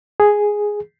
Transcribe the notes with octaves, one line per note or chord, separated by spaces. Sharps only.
G#4